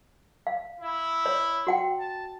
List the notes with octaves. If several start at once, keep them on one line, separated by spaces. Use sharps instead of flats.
F5
E4
C#5
F#4 F#5 G5
A5